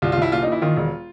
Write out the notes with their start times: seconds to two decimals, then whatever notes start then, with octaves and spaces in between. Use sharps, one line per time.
0.02 C2 F4
0.12 F4
0.17 C2 E4
0.32 A#2 F4
0.42 D#4
0.47 A#2
0.52 E4
0.62 D#3 F4
0.76 E1